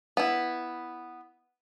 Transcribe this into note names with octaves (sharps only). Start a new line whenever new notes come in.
B3 E4